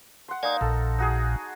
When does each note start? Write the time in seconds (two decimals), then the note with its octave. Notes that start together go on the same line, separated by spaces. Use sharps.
0.28 F#5 C6
0.43 A#3 D#4 D5 G#5
0.61 A#1 A#2 A4
0.98 D#4 F#4 G#4